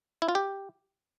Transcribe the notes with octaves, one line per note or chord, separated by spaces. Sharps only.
E4
F4
G4